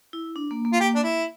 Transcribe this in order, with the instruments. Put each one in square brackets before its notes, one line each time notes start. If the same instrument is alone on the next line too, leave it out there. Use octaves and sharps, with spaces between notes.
[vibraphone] E4
D4
A#3
A#3
[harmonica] F4
G4
D4
E4